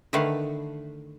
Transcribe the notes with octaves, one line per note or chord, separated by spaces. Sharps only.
D3 D#3 A3 B4 F5 F#5